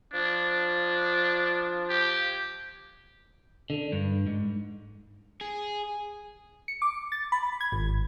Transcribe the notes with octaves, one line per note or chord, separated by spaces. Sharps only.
F3 D4
G4
D3
G2
G#2
G#4
C#7
D6
A6
B5
G#6
G#1